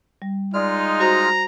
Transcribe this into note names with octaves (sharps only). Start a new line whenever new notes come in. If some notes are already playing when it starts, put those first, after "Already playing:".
G3
G#3 D#4 F4 D5 F6
F#4 C5 A#5